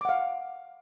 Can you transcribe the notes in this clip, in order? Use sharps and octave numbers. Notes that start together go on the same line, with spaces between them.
F5 F#5 D6